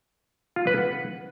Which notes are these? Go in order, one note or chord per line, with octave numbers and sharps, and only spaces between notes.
F4
B4
F#5